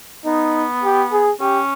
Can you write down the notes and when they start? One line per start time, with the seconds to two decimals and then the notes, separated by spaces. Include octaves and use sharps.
0.25 B3 D#4
0.83 G4
1.12 G#4
1.41 C#4 G4